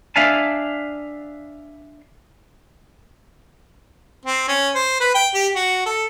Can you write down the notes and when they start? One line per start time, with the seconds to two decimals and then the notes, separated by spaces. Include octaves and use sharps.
0.16 D4 E5 F5 G#5 A5
4.26 C4
4.48 C#4
4.75 C5
5.00 B4
5.15 G5
5.35 G4
5.55 F#4
5.86 A4